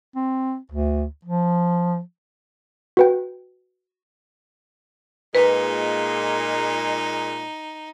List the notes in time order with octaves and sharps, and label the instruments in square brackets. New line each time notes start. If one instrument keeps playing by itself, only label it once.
[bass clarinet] C4
D2
F3
[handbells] F#4 B4 G5
[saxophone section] A#2 G#3 [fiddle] D#4 [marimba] B4